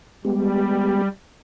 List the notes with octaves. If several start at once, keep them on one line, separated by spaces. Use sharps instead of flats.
G3 G#3 B3 G4